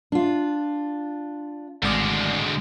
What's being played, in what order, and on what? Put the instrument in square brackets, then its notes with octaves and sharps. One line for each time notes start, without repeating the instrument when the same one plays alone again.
[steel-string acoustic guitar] D4 F4
[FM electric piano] G#1 D5 F6 [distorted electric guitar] D2 G#3